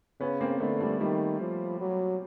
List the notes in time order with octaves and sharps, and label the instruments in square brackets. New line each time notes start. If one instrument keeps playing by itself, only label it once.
[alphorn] C#3 [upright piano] B3 C#4
[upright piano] A#3 C4
[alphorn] D3 [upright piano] A3 B3
[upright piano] G3 A3
[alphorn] D#3 [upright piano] G3 A3
[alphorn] F3
F#3